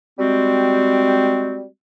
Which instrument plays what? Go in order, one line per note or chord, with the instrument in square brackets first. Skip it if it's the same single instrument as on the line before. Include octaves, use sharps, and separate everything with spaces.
[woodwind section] G3 G#3 C4 F#4